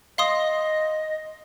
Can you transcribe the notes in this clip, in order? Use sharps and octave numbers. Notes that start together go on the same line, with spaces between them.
D#5 F5 C6 D#6